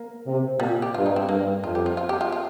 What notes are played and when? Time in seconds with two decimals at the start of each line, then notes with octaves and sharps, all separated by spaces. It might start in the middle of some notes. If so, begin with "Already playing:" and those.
Already playing: A#3
0.25 C3
0.59 A#2 G3
0.82 G4
0.94 G2 F4
1.06 D#4
1.16 C4
1.29 G2 A#3
1.63 F2 F4
1.75 G4
1.86 F4
1.97 F4
2.09 G4
2.21 F4
2.32 F4